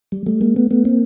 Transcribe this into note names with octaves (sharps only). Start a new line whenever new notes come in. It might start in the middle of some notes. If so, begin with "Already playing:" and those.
G3
G3 A3
G#3 A#3
A3 B3
A3 B3
A#3 C4